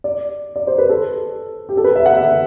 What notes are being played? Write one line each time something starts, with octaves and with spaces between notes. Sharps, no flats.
D5
D5
C5
B4
A4
G4
A4
B4
E5
F#5
E5